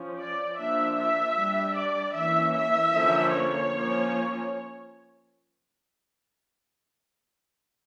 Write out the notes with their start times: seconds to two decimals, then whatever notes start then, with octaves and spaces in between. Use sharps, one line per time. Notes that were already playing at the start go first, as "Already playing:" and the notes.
Already playing: F3 C#4
0.18 D5
0.57 F3 A#3 D4 E5
0.96 E5
1.36 G3 D4
1.75 D5
2.14 E3 A#3 C#4 E5
2.54 E5
2.93 D3 F3 A#3 C#4
3.32 C#5
3.72 F3 A#3 C#4